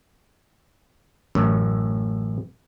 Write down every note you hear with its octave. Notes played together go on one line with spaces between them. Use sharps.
A1 F#2